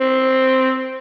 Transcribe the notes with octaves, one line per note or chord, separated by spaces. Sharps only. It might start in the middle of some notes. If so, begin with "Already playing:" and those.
C4